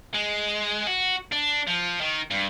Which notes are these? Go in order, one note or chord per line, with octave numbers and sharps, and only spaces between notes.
G#3
F#4
D4
F3
D#3
G2